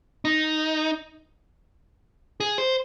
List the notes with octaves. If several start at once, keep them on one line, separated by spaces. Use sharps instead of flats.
D#4
G#4
C5